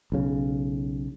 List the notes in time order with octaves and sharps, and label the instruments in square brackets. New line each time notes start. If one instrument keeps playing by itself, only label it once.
[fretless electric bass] B1 C#3